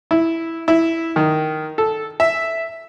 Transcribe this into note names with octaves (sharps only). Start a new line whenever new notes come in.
E4
E4
D#3
A4
E5